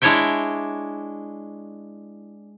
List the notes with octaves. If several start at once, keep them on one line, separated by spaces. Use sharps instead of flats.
G#3 D4 E4 C#5 E5 G5